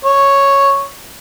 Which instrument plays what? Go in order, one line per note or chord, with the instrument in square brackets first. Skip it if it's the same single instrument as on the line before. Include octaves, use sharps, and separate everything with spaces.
[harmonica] C#5